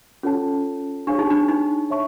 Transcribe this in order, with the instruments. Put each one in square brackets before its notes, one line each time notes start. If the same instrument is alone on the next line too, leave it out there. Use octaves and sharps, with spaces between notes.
[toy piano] C#4 [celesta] F4 A4 C#5 F#5 A5
[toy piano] D4 [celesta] G#4 C#5 F5 G#5 C#6
[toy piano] D#4
D4
D#4
[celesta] C#5 E5 A5 C#6